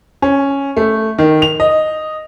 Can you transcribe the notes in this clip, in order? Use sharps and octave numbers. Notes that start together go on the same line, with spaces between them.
C#4
A3
D#3
F7
D#5